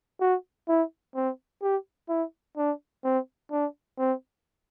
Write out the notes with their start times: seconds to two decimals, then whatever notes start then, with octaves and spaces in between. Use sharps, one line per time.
0.21 F#4
0.69 E4
1.16 C4
1.63 G4
2.09 E4
2.57 D4
3.05 C4
3.52 D4
3.99 C4